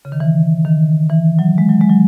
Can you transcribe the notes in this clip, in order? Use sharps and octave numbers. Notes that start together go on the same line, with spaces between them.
C#3
D#3
E3
D#3
E3
F#3
G#3
F#3
G#3
F#3